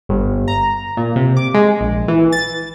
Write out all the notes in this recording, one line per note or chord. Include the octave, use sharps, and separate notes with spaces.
G1
A#5
A#2
C3
D6
G#3
A#1
E3
A6